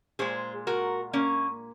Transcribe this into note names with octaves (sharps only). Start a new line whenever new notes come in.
A#2 G#3 G#4 C5
F#4 A#4
A#3 C#4